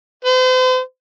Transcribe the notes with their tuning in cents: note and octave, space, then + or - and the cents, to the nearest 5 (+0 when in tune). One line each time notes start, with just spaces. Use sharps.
C5 -40